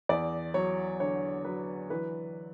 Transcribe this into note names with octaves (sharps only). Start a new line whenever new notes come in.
E2 D5
F#3 C#5
D3 C#5
F#3 B4
E3 B4